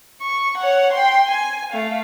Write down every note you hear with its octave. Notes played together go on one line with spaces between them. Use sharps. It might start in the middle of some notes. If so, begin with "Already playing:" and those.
C#6
C#5 F#5
G5 C6
G#5
A3 F5